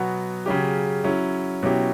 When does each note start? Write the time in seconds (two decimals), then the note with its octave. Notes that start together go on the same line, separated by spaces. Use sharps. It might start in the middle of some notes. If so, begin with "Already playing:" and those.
Already playing: B2 F#3 B3 F#4
0.46 C#3 F#3 C#4 G4
1.04 F#3 C#4 E4
1.63 B2 F#3 C#4 E4 G4